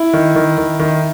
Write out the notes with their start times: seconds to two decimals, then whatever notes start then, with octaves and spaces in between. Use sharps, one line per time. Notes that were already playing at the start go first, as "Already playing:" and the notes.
Already playing: E4
0.13 D#3
0.36 D#3
0.58 D#3
0.80 D#3